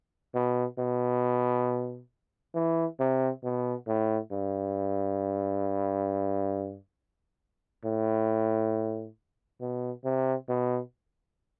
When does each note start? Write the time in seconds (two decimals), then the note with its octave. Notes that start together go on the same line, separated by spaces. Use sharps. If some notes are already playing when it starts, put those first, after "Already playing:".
0.35 B2
0.78 B2
2.55 E3
3.00 C3
3.44 B2
3.87 A2
4.31 G2
7.85 A2
9.61 B2
10.04 C3
10.49 B2